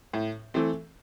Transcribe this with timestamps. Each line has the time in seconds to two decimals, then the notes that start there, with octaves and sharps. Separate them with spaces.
0.14 A2
0.54 E3 A3 C4